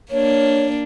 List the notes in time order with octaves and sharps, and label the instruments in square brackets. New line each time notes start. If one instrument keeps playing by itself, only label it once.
[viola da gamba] A#3 D4 [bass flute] C#5